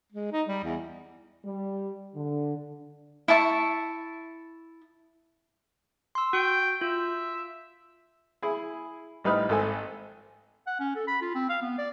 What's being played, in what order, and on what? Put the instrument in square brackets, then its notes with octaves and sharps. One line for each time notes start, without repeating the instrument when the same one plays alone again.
[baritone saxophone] G#3
D#4
G3
E2
[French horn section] G3
D3
[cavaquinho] E4 E5 A5 C#6
[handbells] C6 E6
[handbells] F#4 [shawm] G5
[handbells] F4 [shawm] E5
[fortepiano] E4 G#4
A1 G3 D#4 B4 D#6 F6
G#1 A4 G#5
[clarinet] F#5
C#4
A4
B5
F4
C4
F5
B3
D5